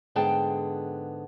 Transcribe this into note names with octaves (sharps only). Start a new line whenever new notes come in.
G#2 D3 B3 G#4 G5 A5